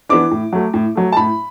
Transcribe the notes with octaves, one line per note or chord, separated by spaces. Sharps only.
E3 B3 D4 D6
A2
F#3 A3
A2
F#3 A3
A5
A2 B5